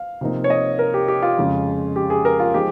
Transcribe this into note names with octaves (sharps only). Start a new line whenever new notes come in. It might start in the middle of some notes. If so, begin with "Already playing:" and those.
Already playing: F5
C3 F3 A#3 D#4
C#5
D#5
A#4
G4
G4
F4
F2 C#3 G#3
G4
G#4
A#4
F4
F3 G#3 D#4 G4